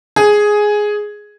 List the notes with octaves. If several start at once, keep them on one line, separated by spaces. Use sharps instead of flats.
G#4